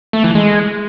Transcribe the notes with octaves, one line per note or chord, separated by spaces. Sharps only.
A3
E3
G#3